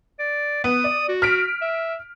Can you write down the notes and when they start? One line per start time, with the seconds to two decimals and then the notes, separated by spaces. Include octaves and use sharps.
0.19 D5
0.64 B3 D#6
0.84 D5
1.09 F#4
1.22 F6 B6 D7
1.62 E5